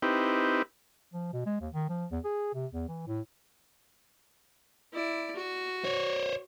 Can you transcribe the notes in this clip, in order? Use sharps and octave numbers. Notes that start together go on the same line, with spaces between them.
C4 D#4 E4 G4 B4
F3
B2
G#3
D#2
D#3
F3
E2
G#4
C3
E2
E3
A2
E4 D5
F#4
C5 C#5